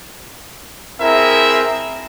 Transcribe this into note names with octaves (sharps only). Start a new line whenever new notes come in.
C4 E4 G#4 A#4 E5